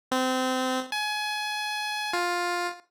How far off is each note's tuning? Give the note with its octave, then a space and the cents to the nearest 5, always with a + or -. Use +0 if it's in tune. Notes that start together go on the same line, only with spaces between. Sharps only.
C4 -25
G#5 +25
F4 +10